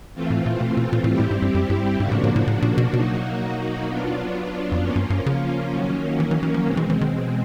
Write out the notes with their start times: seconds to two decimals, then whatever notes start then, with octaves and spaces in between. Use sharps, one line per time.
0.14 E3 A3 C4 F4
0.31 A2
0.46 A#2
0.61 B2
0.77 B2
0.93 A#2
1.04 A#2
1.07 A2 G3 C4 E4 G4
1.20 A2
1.31 G#2
1.42 G2
1.55 F#2
1.70 G2
1.79 G#2
1.86 G2
2.00 G#2 C#3 F3 A#3 D4 F#4
2.12 A2
2.24 A2
2.36 A2
2.47 A2
2.62 A#2
2.78 B2
2.93 B2 F#3 A#3 D#4 F#4
3.86 F#3 B3 D4 F4
4.72 F2
4.80 F#2 F3 A#3 C#4 F4
4.96 G2
5.10 G2
5.26 C#3
5.73 D#3 F#3 A#3 C#4
6.20 E3
6.31 E3
6.43 E3
6.54 F3
6.65 B2 G#3 C4
6.77 E3
6.90 E3
7.01 D#3
7.12 E3
7.21 F3
7.28 E3